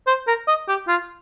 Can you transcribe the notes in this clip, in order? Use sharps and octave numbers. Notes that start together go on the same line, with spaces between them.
C5
A#4
D#5
G4
F4